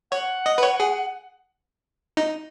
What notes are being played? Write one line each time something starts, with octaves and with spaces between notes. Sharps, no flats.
C#5 F#5
D#5
B4
C#5
G#4
D#4